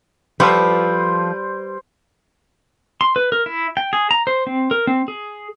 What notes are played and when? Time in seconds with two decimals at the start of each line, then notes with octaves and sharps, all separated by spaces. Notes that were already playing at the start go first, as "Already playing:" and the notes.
0.40 F3 G3 F4 A4 B4 C5
3.01 C6
3.16 B4
3.32 A#4
3.46 E4
3.77 G5
3.93 G#4
4.11 A#5
4.27 C5
4.47 C4
4.71 A#4
4.87 C4
5.08 G#4